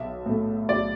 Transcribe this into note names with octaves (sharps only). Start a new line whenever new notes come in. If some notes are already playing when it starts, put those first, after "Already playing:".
Already playing: B1 E5
A2 A3
B1 D5